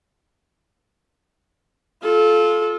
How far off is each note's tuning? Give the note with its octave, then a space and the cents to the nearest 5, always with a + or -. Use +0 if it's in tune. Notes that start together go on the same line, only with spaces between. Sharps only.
F4 +0 A4 -25